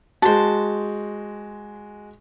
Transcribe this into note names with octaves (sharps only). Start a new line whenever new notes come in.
G#3 F#4 C5 A5